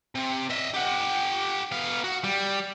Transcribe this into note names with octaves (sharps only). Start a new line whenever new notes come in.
C3
D#5 E5
G4 F#5
B3 F5
F#4
G3